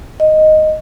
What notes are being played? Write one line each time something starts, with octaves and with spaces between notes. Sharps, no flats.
D#5